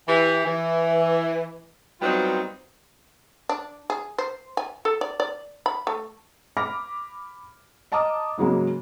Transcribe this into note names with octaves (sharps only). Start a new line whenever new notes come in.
E3 G4
E3
F#3 G3 B3 C4 D#4 F4
D4
G#4
C5
G#5
A4
D5
D5
B5
A3
B5 D6 F6 A#6
D#5 A5 A#5 D6 D#6 F6
G#2 C#3 F#3 G#3 A#3